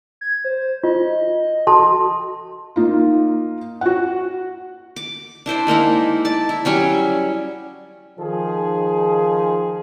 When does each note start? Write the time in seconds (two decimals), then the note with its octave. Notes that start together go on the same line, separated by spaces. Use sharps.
0.21 G#6
0.44 C5
0.83 F4 D#5
1.67 F#4 A4 A5 C6
2.76 A#3 D#4 F4
3.81 F#4 F#5
4.96 D6
5.46 D4 E4 C5 D5
5.67 G#3 A#3 D#4 E4
6.25 D5 A5
6.49 E4
6.65 F#3 G3 C#4 C#5
8.19 D#3 F3 G#4